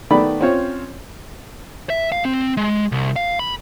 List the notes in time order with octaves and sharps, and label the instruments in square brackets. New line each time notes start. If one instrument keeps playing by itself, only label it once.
[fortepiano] D#3 A3 B3 D5 B5
C4 C#4 F4 C5 C#5
[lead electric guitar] E5
F5
C4
G#3
C2
F5
B5